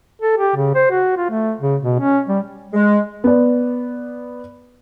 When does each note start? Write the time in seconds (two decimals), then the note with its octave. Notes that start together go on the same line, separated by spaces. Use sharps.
0.22 A4
0.38 G4
0.56 C#3
0.75 C5
0.91 F#4
1.17 F4
1.30 A3
1.61 C#3
1.82 B2
2.00 C#4
2.28 G3
2.73 G#3
3.24 B3 D5